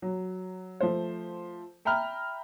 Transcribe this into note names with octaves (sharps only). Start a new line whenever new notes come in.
F#3
F3 A3 C5
E5 G5 A#5 B5 F6